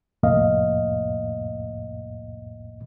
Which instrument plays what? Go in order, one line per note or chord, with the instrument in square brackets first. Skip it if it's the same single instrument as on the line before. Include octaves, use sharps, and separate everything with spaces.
[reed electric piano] C2 F2 A2 A#3 D#5 F5